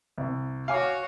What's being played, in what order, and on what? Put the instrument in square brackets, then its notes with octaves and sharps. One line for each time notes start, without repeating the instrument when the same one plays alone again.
[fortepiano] C2
[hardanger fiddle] F#4 C#5 [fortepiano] F5 G#5 D6